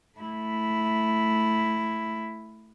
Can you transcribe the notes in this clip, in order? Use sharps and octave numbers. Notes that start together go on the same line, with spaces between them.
A3 E4